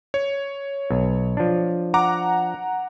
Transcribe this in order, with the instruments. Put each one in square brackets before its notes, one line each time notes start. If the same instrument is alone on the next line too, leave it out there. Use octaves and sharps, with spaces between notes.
[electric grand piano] C#5
[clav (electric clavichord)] B1
F3 D4
[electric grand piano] F#5 A#5 D6